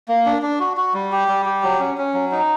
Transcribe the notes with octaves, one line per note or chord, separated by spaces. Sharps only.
A#3
D4
D4
F#4
F#4
G3
G4
G3
G4
F#3
C#4
C#4
F#3
D#4